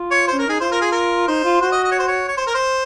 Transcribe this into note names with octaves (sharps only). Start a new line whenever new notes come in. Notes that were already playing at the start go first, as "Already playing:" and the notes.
Already playing: F4
C#5
C#4 C5
A#4
D#4 G#4
F4 C5
A#4
G#4
A#4
D#4 C5
F4
F#4 C5
D#5
D#5
C#5
C5
C#5
C#5
C5
A#4
C5